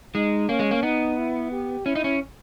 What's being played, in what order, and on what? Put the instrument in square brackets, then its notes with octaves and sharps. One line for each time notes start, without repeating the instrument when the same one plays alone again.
[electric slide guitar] G#3 [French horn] D#4
[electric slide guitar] A#3 [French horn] C#4
[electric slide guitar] G#3
A#3
[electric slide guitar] B3 [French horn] D#4
[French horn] E4
G4
[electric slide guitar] C#4 [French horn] E4
[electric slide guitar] D#4
C#4